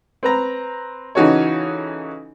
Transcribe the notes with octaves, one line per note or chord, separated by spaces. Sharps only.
C4 B4 A#5
C#3 E3 D#4 F#4 A4 C#5